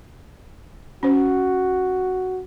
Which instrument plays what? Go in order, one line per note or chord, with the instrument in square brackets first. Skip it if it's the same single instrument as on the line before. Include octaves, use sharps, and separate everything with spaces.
[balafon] C#4 C5 [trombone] F#4